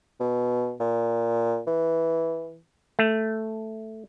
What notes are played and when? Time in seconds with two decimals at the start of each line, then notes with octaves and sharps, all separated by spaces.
0.20 B2
0.80 A#2
1.67 E3
2.99 A3